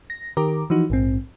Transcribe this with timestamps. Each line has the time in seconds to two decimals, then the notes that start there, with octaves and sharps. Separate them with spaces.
0.10 A#6
0.37 D#3 G4 A#4 A#5 D6
0.70 E3 F3 D#4 F#4
0.90 A#1 G#2 C4